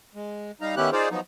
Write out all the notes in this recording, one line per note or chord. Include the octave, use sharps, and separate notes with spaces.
G#3
G3 D#4 F5 A#5
D#3 B3 C#4 E4 G4 F#6
D#4 F4 G#4 C5 D5 F5
F3 F#3 B3 D#4